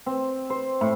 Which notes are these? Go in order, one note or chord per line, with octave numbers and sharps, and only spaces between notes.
C4
C5
A2